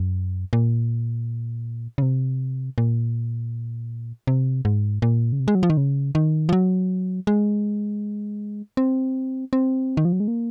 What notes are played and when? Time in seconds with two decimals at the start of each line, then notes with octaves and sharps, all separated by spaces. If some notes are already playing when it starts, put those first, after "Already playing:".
Already playing: F#2
0.53 A#2
1.98 C#3
2.02 C3
2.78 A#2
4.27 C3
4.65 G#2
5.02 A#2
5.32 C#3
5.40 C3
5.48 G#3
5.55 F#3
5.63 F3
5.70 D#3
5.77 C#3
6.15 D#3
6.49 F3
6.53 F#3
7.27 G#3
8.77 C4
9.53 C4
9.97 D#3
10.05 F3
10.13 F#3
10.20 G#3
10.28 A#3